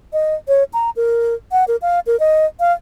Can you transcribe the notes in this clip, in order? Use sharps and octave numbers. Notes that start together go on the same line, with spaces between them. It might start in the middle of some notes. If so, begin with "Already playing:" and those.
D#5
C#5
A#5
A#4
F#5
A#4
F5
A#4
D#5
F5